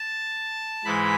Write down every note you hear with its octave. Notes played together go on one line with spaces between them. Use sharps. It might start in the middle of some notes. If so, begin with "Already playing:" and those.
Already playing: A5
G#2 E3 G#3 B5